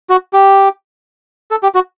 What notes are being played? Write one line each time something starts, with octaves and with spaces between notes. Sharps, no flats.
F#4
G4
A4
G4
F#4